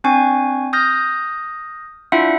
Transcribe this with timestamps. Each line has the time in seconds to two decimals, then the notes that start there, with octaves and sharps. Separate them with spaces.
0.04 C4 D4 G#5 C#6
0.73 D#6 F6 G6 A#6
2.12 D4 E4 F4 E5 F#5